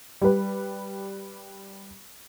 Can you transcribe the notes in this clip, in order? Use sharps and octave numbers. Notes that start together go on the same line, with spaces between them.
G3 B4